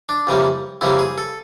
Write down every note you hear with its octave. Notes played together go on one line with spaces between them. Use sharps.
D4
F2 C#3 E3 G3 A#3
F2 C#3 E3 G3 A#3 E4
G#4
A4